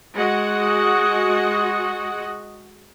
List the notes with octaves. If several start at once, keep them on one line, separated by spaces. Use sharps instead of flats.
G#3 F#4 D#5 F#5